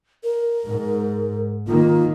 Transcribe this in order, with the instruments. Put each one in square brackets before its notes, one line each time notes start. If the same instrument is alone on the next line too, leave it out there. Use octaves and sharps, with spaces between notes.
[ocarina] A#4
[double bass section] G#2
[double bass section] D#3 A#3 [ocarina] F4